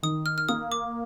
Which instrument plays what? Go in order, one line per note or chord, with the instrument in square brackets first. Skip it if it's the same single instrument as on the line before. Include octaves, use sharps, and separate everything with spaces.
[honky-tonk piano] D#3 [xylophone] D#6
[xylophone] F6
F6
[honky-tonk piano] A#3 [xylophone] D#6
[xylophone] D6